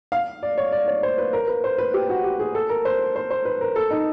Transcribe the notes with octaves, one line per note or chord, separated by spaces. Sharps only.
F5
D5
C#5
D5
C#5
C5
B4
A#4
B4
C5
B4
G4
F#4
G4
G#4
A4
A#4
C5
C5
C5
B4
A#4
A4
D#4